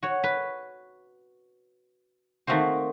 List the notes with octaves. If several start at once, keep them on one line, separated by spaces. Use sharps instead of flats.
F#4 C#5
B4
D#3 A3 A#3 C4 F#4 C5